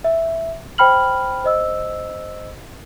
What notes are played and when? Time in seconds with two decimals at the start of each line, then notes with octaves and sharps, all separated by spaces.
0.04 E5
0.78 C5 G5 B5 F6 F#7
1.44 C5 D#5 E6